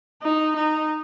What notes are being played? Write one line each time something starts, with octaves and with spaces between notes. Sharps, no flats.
D#4
D#4